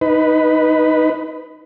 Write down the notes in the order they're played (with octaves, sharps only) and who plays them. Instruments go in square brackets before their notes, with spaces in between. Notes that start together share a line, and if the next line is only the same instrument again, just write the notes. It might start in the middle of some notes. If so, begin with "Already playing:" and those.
[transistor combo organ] D#4 B4